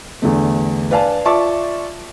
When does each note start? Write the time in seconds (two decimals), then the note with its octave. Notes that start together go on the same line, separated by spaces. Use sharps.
0.22 E2 D3 A3
0.91 B4 D5 F5 G#5 A5
1.25 F4 D5 E5 A5 C#6 D6